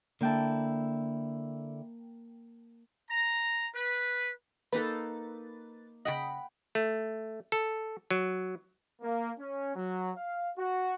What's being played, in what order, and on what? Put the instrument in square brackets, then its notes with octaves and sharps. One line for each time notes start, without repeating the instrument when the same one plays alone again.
[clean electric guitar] D3 E4 [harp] A#3 G5 A5
[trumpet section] A#5
B4
[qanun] A#3 D#4 A4 [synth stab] B4 A6
[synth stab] C#3 D#5 [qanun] F#5 G5 B5
[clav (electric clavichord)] A3
A4
F#3
[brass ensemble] A#3
C#4
F#3
F5
F#4